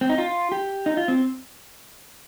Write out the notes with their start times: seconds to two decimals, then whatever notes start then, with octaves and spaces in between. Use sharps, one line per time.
0.01 C4
0.09 D#4
0.18 F4
0.52 G4
0.86 D#4
0.97 F4
1.08 C4